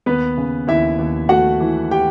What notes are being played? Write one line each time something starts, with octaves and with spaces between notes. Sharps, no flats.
D#2 B3 B4
C#3
D#2 E4 E5
D#2
A3 F#4 F#5
E3
G4 G5